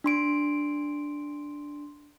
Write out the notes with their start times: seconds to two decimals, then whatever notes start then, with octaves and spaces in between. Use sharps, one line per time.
0.04 D4 C6 D7